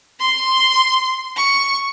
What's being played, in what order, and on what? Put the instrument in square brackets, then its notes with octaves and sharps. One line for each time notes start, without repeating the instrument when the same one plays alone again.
[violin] C6
C#6